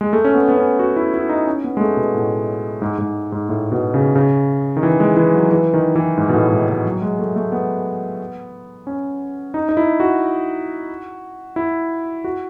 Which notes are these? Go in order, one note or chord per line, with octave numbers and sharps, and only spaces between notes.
G#3
A3
C#4
B3
B3
C#4
F#4
E4
E4
D#4
C#4
B3
G#3
A3
B2
A2
G#2
G#2
G#2
A2
B2
C#3
C#3
D#3
E3
G#3
E3
F#3
E3
D#3
E3
G#2
B2
A2
G#2
B2
F#3
G#3
A3
A3
B3
C#4
D#4
D#4
E4
F#4
E4
F#4